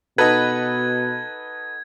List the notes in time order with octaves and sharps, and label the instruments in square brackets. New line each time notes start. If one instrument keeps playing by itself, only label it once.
[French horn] B2 [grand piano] D#4 F#4 A4 [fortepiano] B4 [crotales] G#6